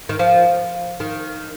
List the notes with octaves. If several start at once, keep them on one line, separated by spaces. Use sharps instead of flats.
D#3
F3
D#3